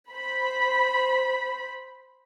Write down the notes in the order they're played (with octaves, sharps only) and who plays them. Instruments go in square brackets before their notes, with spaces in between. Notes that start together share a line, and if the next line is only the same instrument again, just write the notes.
[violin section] C5 B5